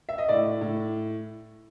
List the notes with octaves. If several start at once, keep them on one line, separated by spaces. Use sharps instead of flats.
E5
D#5
A2 D5
A2